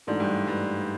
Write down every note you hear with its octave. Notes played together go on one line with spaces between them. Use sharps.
G#2 E3 A3 D4 F#4
G2
G2